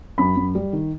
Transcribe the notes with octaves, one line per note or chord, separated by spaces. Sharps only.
F#2 B5
F#2
G3
D#3